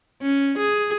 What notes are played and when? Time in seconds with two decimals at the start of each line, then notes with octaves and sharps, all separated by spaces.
0.22 C#4
0.58 G#4